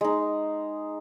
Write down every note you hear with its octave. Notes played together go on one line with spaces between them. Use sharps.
G#3 D#4